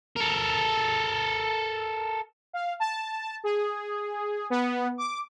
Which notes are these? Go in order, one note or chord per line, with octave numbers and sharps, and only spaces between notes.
A4 A#4
F5
A5
G#4
B3
D6